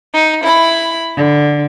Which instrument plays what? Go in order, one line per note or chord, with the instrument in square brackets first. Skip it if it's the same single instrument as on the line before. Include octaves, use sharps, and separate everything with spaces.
[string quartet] D#4
E4 B5
D3